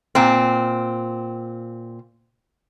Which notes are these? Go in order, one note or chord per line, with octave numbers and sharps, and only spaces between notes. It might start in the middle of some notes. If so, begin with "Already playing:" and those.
A#2 C4